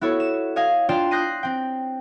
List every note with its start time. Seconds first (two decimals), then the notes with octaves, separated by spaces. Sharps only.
0.01 B3 E4 F#4 A4 C#5
0.20 E7
0.56 C#5 D#5 F5 G#5
0.89 D4 F4 D5 G5 A5 C6
1.11 D#6 F#6 G6 A#6 C7 D#7
1.43 C4 G5